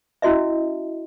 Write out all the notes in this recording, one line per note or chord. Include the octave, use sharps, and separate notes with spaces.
C#4 E4 F#4 D#5 E5